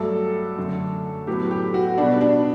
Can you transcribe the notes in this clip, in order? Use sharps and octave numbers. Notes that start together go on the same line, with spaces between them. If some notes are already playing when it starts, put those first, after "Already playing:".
Already playing: G2 F#3 A3 A4
F#2 D3 A3
A2 F#3 B3 G4
G4
F#4
B2 G3 B3 D4
D4